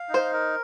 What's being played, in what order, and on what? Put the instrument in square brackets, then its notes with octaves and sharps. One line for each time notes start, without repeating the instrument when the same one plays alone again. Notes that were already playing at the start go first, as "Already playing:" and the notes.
Already playing: [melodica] F5
D#4
[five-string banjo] C5
[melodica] A#4